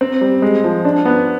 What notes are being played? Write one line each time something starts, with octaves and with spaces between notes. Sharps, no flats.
C4
G3
G#3
F3
D4
B3